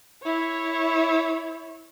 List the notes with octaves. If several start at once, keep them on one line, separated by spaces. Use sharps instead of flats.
E4 C#5